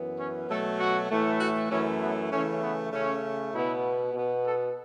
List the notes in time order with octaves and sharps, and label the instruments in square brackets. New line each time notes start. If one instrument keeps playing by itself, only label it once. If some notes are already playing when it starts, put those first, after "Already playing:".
Already playing: [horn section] F#2 E3 B3
C#4
B2 F#3 A3 A4
F#4
A2 E3 A3
F#4
F#2 E3 A3 C#4
B3
C#3 E3 A3 C#4
B3
C#3 A3 C#4
B2 B3 E4
B2 B3
A4